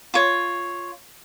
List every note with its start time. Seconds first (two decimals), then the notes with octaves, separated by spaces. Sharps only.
0.14 F4 C#5